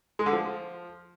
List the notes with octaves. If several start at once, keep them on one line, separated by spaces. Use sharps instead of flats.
G#3
D3
F3